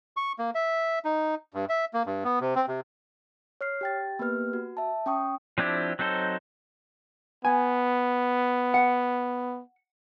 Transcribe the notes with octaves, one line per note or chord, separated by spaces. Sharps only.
C#6
A#3
E5
D#4
G2
E5
A#3
G2
B3
C3
C4
C3
C#5 F6 C7
G4 G5 A6
A#3 B3 G4 B4 F6
F#4
E5 A5
C#4 G5 C#6 D#6
F3 C4 D4 E4 G4
F#3 C4 D#4 A4 C5
B3 G#5
F#5